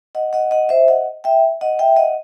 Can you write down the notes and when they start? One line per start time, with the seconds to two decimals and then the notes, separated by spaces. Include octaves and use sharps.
0.15 D#5 F#5
0.33 D#5 F#5
0.51 D#5 F#5
0.69 C5 E5
0.88 D#5 F#5
1.24 E5 G5
1.61 D#5 F#5
1.79 E5 G5
1.96 D#5 F#5